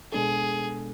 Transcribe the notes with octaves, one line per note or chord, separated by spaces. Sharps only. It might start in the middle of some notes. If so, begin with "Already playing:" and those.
B2 G#3 B3 D4 G#4 A4